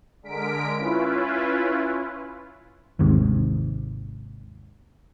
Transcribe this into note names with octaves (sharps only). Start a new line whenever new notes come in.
D3 G#3 A#4 B6 D7
C#4 E4 F4 B4
G#1 D#2 G#2 C3